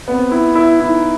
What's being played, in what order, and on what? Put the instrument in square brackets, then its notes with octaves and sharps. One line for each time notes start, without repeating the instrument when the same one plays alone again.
[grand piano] B3 [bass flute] C4
[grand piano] E4
E4
[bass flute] D#4 [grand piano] E4